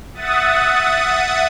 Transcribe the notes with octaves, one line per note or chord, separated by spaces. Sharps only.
E5 F#5 D#6 A6